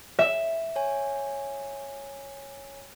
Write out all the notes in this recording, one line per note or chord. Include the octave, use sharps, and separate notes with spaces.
E5
C#5 G#5